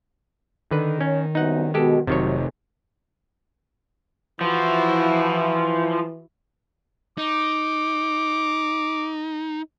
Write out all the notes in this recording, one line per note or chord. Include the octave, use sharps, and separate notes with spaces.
D3 D#3 B4
C#4 C#5
C2 F#2 B3 D#4 F#5
B2 G#3 G4 A4
F1 C3 D#3 F#3 C#5
E3 F3 E4 F#4
D#4 D6